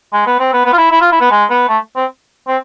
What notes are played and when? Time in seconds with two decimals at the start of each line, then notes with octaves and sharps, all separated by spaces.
0.13 G#3
0.27 B3
0.40 C4
0.53 B3
0.65 B3
0.73 F4
0.78 E4
0.91 E4
1.01 F4
1.12 E4
1.21 B3
1.31 G#3
1.50 B3
1.69 A3
1.96 C4
2.48 C4